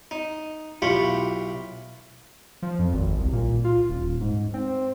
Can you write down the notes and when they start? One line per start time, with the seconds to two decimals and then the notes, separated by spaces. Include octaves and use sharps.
0.11 D#4
0.82 B1 E4 F4 G4 B5 C#6
2.62 F3
2.79 F2
2.94 G#1
3.18 C2
3.33 A#2
3.64 F4
3.89 D#1
4.21 G#2
4.54 C4